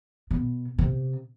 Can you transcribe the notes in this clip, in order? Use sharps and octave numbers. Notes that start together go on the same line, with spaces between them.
B2
C3